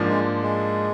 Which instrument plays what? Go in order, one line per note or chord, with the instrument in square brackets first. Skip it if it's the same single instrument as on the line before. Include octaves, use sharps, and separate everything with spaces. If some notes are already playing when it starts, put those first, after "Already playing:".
Already playing: [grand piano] G#2 F3 A#3 D4
[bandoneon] G#3
G#3